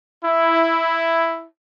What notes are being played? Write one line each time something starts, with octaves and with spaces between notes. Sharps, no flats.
E4